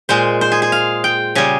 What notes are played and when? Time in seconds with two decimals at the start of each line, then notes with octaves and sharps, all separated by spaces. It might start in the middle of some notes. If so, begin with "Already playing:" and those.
0.09 A#2 G#3 C5
0.41 C5
0.52 G#4
0.62 G#4
0.72 F5
1.04 G5
1.35 C#3 G3 G#4